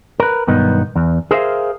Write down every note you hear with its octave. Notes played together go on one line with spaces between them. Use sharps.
A#4 B4
B1 G2 D#3 B3 D#4
E2
G#4 A#4 C5 D5 E5 F5